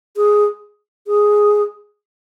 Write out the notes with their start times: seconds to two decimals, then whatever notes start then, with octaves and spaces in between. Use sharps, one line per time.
0.17 G#4
1.07 G#4